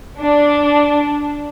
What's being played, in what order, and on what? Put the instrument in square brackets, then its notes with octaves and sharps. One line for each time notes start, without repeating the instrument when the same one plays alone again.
[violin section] D4